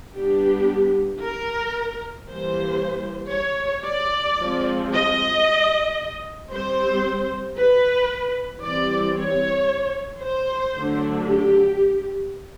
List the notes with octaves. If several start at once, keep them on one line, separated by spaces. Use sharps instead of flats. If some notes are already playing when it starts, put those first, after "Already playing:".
G3 B3 D4 G4
A#4
E3 G3 A#3 C5
C#5
D5
F3 G#3 C4
D#5
G3 C4 C5
B4
E3 G3 C4 D5
C#5
C5
D3 F#3 A3 D4
G4